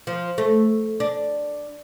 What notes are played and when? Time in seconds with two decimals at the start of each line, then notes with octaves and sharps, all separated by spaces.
0.07 F3
0.38 A3
1.00 D4